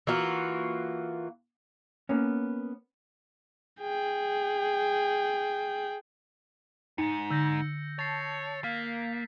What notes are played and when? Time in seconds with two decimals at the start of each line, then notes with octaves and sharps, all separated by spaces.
0.07 E3 A#3 F4 F#4
2.09 A#3 B3 C#4
3.81 G#4 G5
6.98 F2 G#2 D#4 C#7
7.30 D3 E6 G6 A#6
7.99 C#5 A5 A6 C7
8.64 A#3 F5 B6